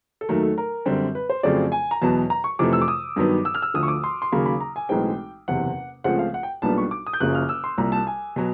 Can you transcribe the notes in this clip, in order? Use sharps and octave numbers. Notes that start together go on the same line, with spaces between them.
A4
D#2 D#3 F#3 A3 A#4
A4
A#4
F#2 D3 G3 C4
B4
C5
F2 C#3 F#3 A3 C4 D5
G#5
A#5
E2 B2 F#3 B3 A5
A#5
C#6
F2 C3 E3 A3 D6
E6
D6
D#6
G2 D#3 F#3 B3
E6
F6
E6
D2 D3 F3 D#6
C#6
D6
C6
C6
D#2 C#3 F#3 A#3 B5
B5
A#5
G#5
B1 A2 E3 G#3 C4 G5
F#1 E2 C3 F#5
C#2 C#3 F3 A3 C4 F#5
F5
F#5
G5
B1 A#2 G3 B3 D4 A5
C#6
D6
D#6
G6
F#1 F#2 C#3 F3 A#3 F#6
F6
E6
C6
C2 A#2 G3 A#5
A5
G#5
B2 F#3